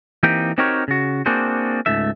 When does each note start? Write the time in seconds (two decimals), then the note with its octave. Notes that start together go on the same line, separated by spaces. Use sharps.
0.23 E3 A#3 C4 D#4 G4 G5
0.58 C4 D#4 F#4 G4 A#4 C#5
0.88 C#3 F#4
1.26 A#3 C4 D4 F#4 G#4 C5
1.86 C#2 G#2 A3 E5